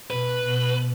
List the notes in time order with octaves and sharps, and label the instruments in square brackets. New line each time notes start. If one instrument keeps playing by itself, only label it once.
[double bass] B2 [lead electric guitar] B4
[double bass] B2